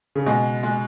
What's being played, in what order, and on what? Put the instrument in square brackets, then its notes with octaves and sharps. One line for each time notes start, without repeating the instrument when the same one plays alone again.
[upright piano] C#3
[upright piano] B2 [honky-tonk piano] G#3
[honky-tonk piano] G#3